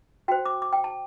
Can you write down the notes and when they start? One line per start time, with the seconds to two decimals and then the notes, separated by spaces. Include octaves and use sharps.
0.28 F#4 C5 G5
0.46 D6
0.62 D6
0.73 G5
0.84 A5